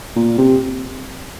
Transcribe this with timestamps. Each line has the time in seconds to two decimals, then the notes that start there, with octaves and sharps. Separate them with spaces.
0.16 A#2
0.38 C3